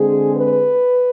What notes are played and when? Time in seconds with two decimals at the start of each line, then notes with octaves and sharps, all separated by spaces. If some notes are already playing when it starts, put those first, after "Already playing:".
Already playing: D3 G#3 C4 G#4
0.36 B4